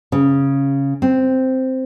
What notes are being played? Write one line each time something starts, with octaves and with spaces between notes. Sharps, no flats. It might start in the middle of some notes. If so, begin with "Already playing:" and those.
C#3
C4